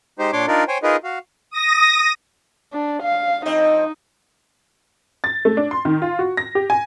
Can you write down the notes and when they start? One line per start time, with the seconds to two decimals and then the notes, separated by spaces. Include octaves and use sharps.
0.19 G#3 D#4 G4 C5
0.33 A#2 D4 C#5 C6 D6
0.48 D4 D#4 F4 A#4 D5
0.68 C5 C#5 G5 G#5
0.83 D#4 F4 G#4 A#4 B4 D#5
1.04 F#4 F5
1.50 D#6 A#6
2.73 D4
3.02 F5
3.46 F2 C4 D#4 D#5
5.24 A6
5.45 A3
5.57 D4
5.71 C6
5.85 D#3
6.02 F4
6.19 F#4
6.37 A#6
6.55 G4
6.70 G#5